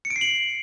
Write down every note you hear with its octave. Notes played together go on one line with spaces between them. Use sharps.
C#7
D7
C7
F#7